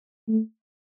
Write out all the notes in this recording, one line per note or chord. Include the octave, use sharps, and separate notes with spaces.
A3